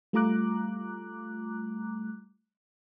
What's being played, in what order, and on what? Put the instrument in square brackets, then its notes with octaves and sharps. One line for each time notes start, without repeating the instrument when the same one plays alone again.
[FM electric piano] G3 A3 F4 A#5 D6 F#6